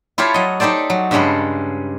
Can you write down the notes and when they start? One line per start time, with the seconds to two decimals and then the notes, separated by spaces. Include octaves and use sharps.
0.18 E4 F4 G4 A4 C#5 F5
0.34 F#3 D#5
0.60 D#4 G4 A4 C5 D5
0.90 F#3
1.11 G2 C#3 G3 G#3 A4 B5